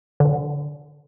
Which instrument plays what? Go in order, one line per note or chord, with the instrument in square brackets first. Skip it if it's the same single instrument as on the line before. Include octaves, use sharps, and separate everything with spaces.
[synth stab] D3